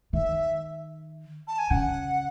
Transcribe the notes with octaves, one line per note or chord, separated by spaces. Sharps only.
D#3 E5
A5
G#5
C#3 F#5